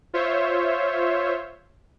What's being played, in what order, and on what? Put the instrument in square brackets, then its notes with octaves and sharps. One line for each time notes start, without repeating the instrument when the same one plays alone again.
[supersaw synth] F4 C5 C#5 E5